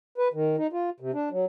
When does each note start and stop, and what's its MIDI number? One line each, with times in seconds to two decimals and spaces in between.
0.18 0.28 71
0.33 0.56 51
0.57 0.67 63
0.73 0.90 65
1.00 1.11 48
1.14 1.29 62
1.31 1.45 54